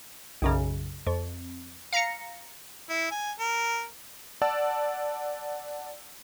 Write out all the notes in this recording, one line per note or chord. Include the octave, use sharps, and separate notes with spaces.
B1 F#2 C#3
F2
F5 A#5 A#6 C#7
E4
G#5
A#4
D5 F#5 A5 E6